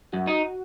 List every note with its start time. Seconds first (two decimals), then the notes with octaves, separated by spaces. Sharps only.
0.13 F#2 F#4
0.27 D#4